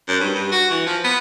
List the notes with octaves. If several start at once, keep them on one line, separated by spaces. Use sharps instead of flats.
F#2
G2
G2
F#4
E3
F3
B3